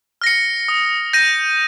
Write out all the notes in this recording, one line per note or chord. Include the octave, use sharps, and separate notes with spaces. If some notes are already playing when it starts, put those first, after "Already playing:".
F6 A#6 C#7
D#6
G6 A#6 D#7